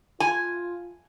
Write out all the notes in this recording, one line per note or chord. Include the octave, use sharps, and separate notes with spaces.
F4 G#5